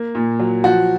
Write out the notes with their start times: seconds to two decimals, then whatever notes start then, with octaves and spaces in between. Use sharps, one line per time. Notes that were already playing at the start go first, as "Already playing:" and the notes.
Already playing: A#3
0.15 A#2
0.39 F#3
0.64 F3 F#4